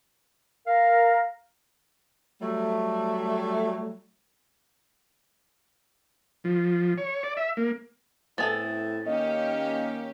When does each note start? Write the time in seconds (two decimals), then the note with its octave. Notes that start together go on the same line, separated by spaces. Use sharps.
0.67 A#4 F5
2.42 F#3 G3 A3
6.44 F3
6.98 C#5
7.23 D5
7.37 E5
7.57 A#3
8.38 A2 B3 C4 E4 G#4 A4 A6
9.06 D#3 A#3 C#4 G4 D#5